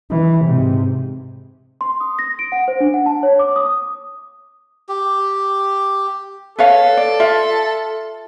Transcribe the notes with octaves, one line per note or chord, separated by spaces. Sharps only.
E3
G#2 C3
C6
D#6
A#6
D7
F#5
C5
D4
F#5
A5
C#5
D6
D#6
G4
A4 B4 C#5 F5
D5
F4 E5